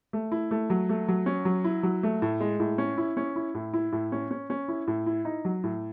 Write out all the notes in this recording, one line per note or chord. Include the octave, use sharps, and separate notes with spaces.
A3
E4
A3
F#3
A3
F#3
C#4
F#3
E4
F#3
A3
A2
G#3
A2
C#4
E4
C#4
E4
A2
E4
A2
C#4
C#4
C#4
E4
A2
E4
D#4
F#3
A2